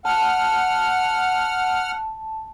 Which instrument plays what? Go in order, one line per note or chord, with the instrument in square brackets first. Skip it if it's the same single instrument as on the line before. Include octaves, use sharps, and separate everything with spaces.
[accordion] F#5 F6 [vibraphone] A5